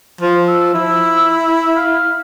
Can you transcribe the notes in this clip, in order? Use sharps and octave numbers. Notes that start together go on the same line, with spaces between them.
F3 F4
E6
E4
F5